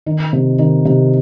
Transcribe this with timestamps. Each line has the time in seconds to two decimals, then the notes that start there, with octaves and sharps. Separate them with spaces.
0.06 D#3
0.33 C3
0.59 D#3
0.85 C3